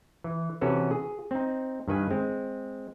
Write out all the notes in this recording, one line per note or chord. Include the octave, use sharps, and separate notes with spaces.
E3
C3 E3 C#4 F#4 A4 B4
G#4
C4 D#4
G2 D#3 B4 G#5
G#3 C4